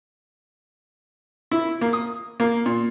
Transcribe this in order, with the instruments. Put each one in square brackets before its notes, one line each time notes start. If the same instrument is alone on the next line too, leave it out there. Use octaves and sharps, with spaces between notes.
[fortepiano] E4
A#3
D#6
A#3
A#2